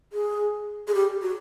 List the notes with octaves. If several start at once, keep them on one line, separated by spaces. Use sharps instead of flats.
G#4
G#4
G4
F#4